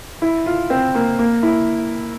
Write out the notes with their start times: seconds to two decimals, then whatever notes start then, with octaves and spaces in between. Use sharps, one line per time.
0.22 E4
0.46 F4
0.70 C4
0.95 A#3
1.19 A#3
1.43 E4